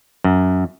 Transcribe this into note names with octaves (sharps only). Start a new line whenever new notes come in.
F#2